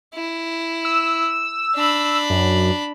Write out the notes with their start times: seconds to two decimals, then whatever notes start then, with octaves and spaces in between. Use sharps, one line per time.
0.14 E4
0.85 E6
1.75 D4 B5
2.30 F#2